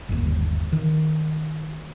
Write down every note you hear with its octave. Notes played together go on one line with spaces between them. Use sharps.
G1 D#2
D#3